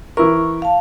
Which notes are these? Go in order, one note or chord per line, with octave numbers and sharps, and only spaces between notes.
E3 E4 A#4 C#6
F5 A5